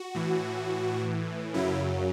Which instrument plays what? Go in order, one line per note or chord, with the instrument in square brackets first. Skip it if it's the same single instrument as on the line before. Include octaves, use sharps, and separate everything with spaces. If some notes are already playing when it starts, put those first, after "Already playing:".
Already playing: [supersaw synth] F#4
A2 E3
F#2 C#3 F#3 E4